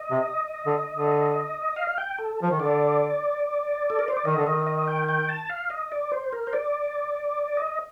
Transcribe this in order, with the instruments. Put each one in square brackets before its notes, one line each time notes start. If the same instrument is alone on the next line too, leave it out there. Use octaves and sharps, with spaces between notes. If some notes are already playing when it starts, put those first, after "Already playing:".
Already playing: [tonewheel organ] D#5
[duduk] C3
D3
D3
[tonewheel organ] F5
G5
A4
[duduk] F3
D#3
[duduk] D3 [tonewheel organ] D5
[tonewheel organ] A4
A#4
C5
D5
[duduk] D#3 [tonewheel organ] D#5
[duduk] D3
[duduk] D#3 [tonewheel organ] D#5
[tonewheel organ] D#5
G5
G5
A5
F5
D#5
D5
C5
A#4
C5
D5
D#5